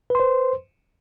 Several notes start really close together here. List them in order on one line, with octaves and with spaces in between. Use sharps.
B4 C6 C5